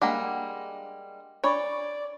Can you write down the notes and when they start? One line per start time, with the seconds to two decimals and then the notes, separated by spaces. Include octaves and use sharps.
0.02 G3 G#3 A#3 D4 F#5 D6
1.44 D4 C#5 D5 B5 C#6